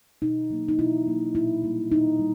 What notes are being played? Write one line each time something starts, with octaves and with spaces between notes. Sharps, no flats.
B2 D#4
F#3 A#3
D#4
B2 E4
F#3 A#3
A#2 E4
G3 A#3
A#2 D#4
G3